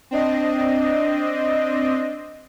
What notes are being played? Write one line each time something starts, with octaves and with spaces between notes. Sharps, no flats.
C4 D4 D#5